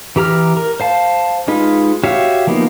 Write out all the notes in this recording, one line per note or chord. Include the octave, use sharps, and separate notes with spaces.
E3 G4 A#5 F6
A#4
C5 F5 A5
G#3 D#4 F4 B4
F#4 G4 C#5 E5 F5
F3 A#3 B3 D#4